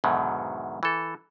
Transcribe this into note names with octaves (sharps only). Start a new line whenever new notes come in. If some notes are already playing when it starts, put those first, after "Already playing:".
E2 G#2 B2 D3 D#3 F#3
E3 A4